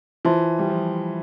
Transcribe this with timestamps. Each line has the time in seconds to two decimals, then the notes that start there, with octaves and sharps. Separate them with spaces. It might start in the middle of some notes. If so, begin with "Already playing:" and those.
0.25 E3 F4 C5 E5 A5 C6
0.59 G3
0.69 F3